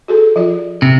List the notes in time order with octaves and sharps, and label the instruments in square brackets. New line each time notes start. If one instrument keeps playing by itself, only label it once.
[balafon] F#4 G#4 A4
F3 F4 D5
[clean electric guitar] C3